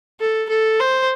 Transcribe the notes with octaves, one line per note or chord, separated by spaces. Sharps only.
A4
A4
C5